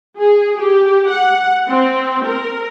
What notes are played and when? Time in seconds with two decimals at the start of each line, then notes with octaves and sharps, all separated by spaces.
0.18 G#4
0.59 G4
1.10 F#5
1.69 C4
2.26 A#4